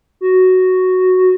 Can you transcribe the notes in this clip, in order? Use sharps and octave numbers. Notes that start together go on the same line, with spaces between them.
F#4